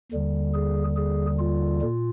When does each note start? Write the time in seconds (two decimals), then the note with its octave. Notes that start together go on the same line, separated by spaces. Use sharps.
0.12 D#2 D3 G3
0.54 G#4
0.96 G#4
1.39 F4
1.82 A#2